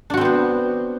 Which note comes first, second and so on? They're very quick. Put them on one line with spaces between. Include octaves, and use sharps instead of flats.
D4 F#4 C4 B3 C5